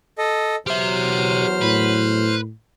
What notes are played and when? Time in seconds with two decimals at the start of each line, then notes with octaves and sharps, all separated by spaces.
0.18 A4 D#5
0.67 E2 F#3 G4 C5 E5 F6
1.62 A2 B4